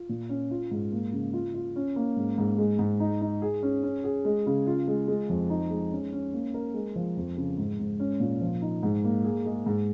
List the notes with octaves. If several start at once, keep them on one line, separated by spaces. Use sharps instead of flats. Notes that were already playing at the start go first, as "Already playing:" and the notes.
Already playing: F4
A#2
C#4
F4
G#2
A#3
C#3
F4
F4
C#4
A#3
G#2
G#2
G#3
G#2
D#4
D#4
G#4
C#4
C#4
G#4
G#3
C#3
F4
G#3
G#3
F2
D#4
G#3
C#4
C#4
A#3
A#4
G#3
F3
F2
C#3
G#2
G#2
C#4
A#2
F3
D#4
G#2
A#3
G#4
G#3
G#2